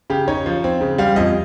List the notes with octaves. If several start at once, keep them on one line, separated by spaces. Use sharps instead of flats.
C#3 G4
D#4 C#5
F3
C4
C#3
G3 F5
F2 D#5